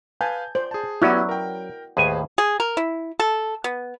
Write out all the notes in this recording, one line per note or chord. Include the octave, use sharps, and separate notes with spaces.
B4 F5 G#5 A5 G6
C5 D5 G6
G#4 A5
F#3 B3 C#4 E4 F#4 G4 D5
A#4 G5
D#2 A2 G#4 B4 C5 G#5
G#4
A#4
E4
A4
B3